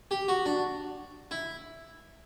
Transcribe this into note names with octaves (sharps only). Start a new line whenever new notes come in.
G4
F#4
D4
E4